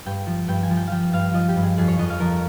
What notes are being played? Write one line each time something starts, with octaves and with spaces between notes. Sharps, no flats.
G2 G5
F3
G2 G5
G#5
F3
G5
F3 F5 G5
G2 F5
F3 D#5
G4
G2
G#4
F2 G#4
C#5
F2 D#5
F5
F3 A#4